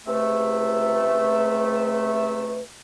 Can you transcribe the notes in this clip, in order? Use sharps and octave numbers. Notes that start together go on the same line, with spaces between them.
C#2 C3 A3 B4 E5